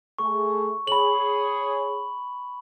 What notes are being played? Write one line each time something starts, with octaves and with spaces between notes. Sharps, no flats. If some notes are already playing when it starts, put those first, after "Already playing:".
A3 G#4 C#6
G#4 C#5 B5 F#7